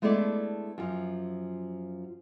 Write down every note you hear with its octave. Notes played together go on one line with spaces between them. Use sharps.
G#3 A3 B3 D4 E4 D5
F#2 F3